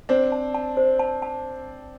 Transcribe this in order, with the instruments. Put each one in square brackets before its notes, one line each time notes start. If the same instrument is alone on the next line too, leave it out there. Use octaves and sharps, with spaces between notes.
[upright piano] C4 D4 [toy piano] C5
[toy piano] A5
A5
C5
A5
A5